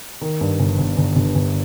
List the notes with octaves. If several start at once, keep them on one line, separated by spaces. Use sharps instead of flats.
D#3
G2
G1
G1
G1
G1
G1